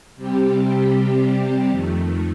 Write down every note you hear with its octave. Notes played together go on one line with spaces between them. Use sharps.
C3 G3 C4 G4
F2 D#3 A3